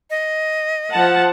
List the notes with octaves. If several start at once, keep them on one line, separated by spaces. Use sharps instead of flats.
D#5
F3 F#5 A5